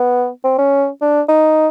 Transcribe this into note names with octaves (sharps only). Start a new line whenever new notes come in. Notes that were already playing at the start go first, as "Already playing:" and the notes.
Already playing: B3
C4
C#4
D4
D#4